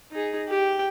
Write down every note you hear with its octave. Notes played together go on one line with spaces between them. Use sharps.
D#4 G#4
G4 G5